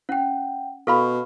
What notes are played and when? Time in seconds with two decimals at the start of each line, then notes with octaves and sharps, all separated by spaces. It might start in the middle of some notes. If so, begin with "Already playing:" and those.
0.09 C#4 F#5 G5
0.87 B2 A4 F5 B5 C#6 F6